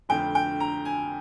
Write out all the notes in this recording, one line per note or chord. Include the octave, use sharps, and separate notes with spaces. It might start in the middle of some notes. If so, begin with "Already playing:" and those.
F1 F2 D3 G5
G5
A#5
G#5